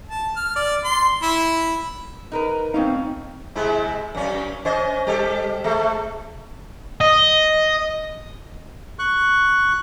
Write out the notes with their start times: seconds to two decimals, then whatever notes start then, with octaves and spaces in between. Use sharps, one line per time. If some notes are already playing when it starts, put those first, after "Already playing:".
0.08 A5
0.36 F6
0.56 D5
0.85 C6
1.22 E4
2.32 D#4 A#4 B4
2.74 A3 C4 C#4 D#4 F5
3.55 C3 G#3 E4
4.15 F#2 C#4
4.65 C#4 C5 D#5
5.07 G3 G4 A4
5.64 G#3 A3
7.01 D#5
8.99 C#6 F#6